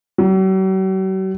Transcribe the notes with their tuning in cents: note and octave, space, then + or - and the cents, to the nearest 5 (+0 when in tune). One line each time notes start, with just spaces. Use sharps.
F#3 +45